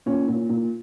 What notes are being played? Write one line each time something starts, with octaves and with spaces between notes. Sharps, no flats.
A#2 C#4
A#2
A#2